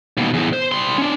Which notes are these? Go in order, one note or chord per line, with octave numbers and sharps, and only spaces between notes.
D#2 B2
E2 A2
C5
G3 C6
C#4 D4